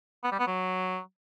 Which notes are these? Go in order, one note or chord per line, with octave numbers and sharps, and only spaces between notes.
B3
G3
B3
F#3